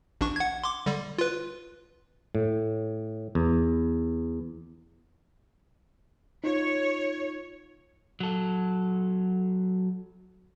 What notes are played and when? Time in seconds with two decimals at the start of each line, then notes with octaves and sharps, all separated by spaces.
0.21 A1 D4 C#6
0.36 F#5 G#6
0.64 C6 D6
0.86 D3 G3
1.18 F4 B4
2.35 A2
3.35 E2
6.44 D#4 F4 C#5
8.20 F#3 A4